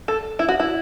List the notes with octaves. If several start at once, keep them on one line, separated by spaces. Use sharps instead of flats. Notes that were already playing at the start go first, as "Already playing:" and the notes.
A4
E4
F#4
E4